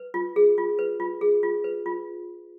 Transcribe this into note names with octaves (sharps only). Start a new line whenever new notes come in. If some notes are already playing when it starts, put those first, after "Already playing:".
Already playing: B4
F4
G#4
F4
B4
F4
G#4
F4
B4
F4